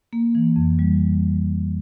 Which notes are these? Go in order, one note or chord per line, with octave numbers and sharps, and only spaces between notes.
A#3
E3
F2
G3